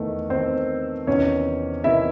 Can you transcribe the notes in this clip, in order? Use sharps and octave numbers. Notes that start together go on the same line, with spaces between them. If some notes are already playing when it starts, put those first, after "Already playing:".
Already playing: E2 D#3 A3
E2 D#3 C4 C5
E2 C3 D#3 C#4 C#5
E2 C3 D#3 E4 E5